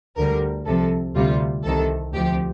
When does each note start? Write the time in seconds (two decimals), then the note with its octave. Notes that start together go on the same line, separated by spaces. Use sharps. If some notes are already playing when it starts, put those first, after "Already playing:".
0.16 D2 D3 G3 A#4
0.65 C2 C3 F3 A4
1.14 D2 C3 G3 F4
1.64 C2 C3 D#3 A4
2.13 D2 C3 F3 G4